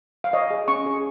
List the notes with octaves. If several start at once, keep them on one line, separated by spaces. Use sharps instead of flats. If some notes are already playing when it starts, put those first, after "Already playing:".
F5
C#5 D#5
G#4
C#4 C#6
G#4